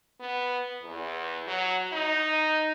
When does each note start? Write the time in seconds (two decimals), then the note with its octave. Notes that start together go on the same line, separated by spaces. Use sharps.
0.20 B3
0.83 E2
1.47 F#3
1.93 D#4